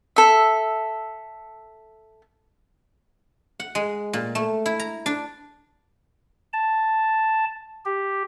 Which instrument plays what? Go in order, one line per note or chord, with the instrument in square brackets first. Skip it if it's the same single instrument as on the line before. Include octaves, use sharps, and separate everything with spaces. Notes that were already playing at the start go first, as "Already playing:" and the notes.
[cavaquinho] A4 E5
[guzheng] F#5
G#3
A#2
A3
E4
A#5
D4
[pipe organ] A5
G4